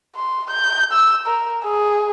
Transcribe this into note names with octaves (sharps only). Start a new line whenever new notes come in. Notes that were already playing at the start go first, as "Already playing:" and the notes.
C6
G6
E6
A#4
G#4